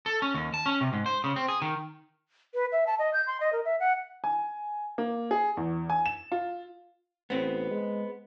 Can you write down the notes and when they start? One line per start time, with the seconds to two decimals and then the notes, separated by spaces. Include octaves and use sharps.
0.06 A4
0.22 C#4
0.34 D#2
0.54 A5
0.66 C#4
0.81 C3
0.93 G#2
1.06 C5
1.24 C#3
1.36 C4
1.48 G#4
1.62 D#3
2.54 B4
2.72 E5
2.87 A5
2.99 D#5
3.14 G6
3.27 C6
3.40 D#5
3.53 A#4
3.65 E5
3.80 F#5
4.24 G#5
4.98 A#3
5.31 G#4
5.57 E2
5.90 G#5
6.06 E7
6.32 F4
7.30 A1 B3 C4
7.71 G#3